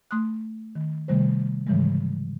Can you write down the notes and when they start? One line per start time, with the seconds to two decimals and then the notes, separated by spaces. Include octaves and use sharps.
0.11 A3 C6 D#6 F#6
0.75 D#3
1.08 C3 D#3 G3 A3 C5
1.67 G#2 C#3 E3 F3 G3 G#3